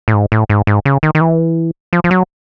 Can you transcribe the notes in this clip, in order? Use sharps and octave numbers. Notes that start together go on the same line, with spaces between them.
A2
G#2
A2
G#2
G#2
C#3
D#3
D#3
E3
F3
F3
F#3